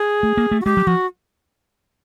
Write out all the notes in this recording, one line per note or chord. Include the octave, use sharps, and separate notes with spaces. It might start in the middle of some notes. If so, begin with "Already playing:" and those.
Already playing: G#4
A3
A#3
A3
F#4
G#3 G4
F#3
F3 F#4